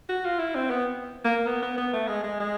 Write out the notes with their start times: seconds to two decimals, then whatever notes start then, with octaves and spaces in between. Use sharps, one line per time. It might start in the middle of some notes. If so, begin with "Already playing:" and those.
0.09 F#4
0.25 F4
0.39 E4
0.55 C4
0.70 B3
1.25 A#3
1.47 B3
1.63 B3
1.78 B3
1.93 A3
2.08 G#3
2.24 G#3
2.40 G#3